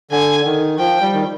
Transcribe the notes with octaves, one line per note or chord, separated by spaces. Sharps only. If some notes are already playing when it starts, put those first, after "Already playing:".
D3 G#5
D#3
F3 G5
G3
D#3